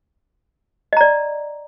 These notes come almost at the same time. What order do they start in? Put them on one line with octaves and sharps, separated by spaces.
D#5 A#5 D5